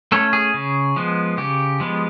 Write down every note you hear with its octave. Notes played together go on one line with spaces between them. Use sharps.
A3 C#4 A4
G#4
C#3
F3 G#3 B3
C#3 G4
F3 G#3 B3